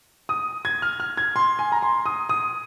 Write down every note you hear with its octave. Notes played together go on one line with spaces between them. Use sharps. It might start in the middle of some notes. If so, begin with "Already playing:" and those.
D#6
G#6
F6
F6
G#6
C6
G#5
A#5
C6
D#6
D#6